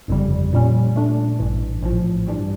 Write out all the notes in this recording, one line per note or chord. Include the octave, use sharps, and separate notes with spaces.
G1 F2 C#3 G3
A#1 A#2 G3 C#4
A#2 A3 D4
A1 G2 E3
A#1 A2 F3
G2 E3 G3 D4